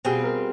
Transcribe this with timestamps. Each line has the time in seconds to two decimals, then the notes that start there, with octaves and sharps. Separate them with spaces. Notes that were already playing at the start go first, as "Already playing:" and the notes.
0.05 B2 G3 C4 F4 G#4
0.24 A#4